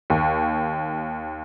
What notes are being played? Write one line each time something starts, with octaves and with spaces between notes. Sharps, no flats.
D#2